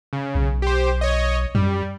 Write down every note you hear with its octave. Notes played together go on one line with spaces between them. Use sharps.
C#3
B1
G4 C5
C#5 D#5
F#2 G3